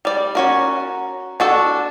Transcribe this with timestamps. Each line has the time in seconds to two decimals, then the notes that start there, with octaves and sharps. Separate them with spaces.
0.05 G3 D5
0.35 C#4 F#4 A#4
1.40 D4 F#4 A4